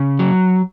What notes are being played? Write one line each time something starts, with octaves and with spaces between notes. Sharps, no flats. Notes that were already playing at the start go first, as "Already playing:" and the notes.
Already playing: C#3
F#3